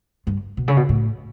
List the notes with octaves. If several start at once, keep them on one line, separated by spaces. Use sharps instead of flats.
G2
B2
C#3
B2
A2